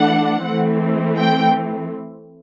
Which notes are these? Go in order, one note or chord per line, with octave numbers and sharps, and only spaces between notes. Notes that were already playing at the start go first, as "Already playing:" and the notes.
Already playing: E3 A3 D4 F#5
E3 A3 C4
G5